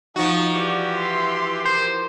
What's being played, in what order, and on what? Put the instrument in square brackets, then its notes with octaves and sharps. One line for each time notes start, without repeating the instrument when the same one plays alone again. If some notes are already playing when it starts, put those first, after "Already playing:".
[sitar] F3 F#4 [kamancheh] D#4 D#5
[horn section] E3 G4 [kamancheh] D5
[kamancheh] E5 C6
[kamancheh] A#4 [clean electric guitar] C5